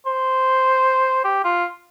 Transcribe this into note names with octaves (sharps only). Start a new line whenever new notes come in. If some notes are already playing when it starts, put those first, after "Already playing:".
C5
G4
F4